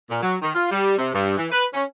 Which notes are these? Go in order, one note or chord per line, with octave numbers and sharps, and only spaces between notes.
A#2
F#3
D#3
F4
G3
C3
G2
E3
B4
C#4